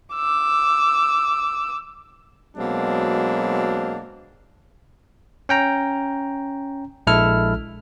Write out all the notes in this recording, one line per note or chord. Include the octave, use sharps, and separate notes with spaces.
D6 E6
B2 F#3 G#3 A#3 C4 D4
C#4 G5 A#5
A#1 G#3 E4 A4 F6